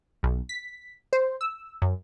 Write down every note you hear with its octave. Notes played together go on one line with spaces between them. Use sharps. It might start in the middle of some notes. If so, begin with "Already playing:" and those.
B1
B6
C5
E6
F#2